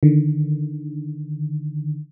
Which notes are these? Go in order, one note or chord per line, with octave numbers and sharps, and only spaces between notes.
D3 D#3